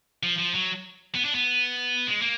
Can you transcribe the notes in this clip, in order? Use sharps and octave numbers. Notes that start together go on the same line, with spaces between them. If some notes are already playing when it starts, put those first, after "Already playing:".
F3
F3
F#3
B3
D4
B3
G#3
A#3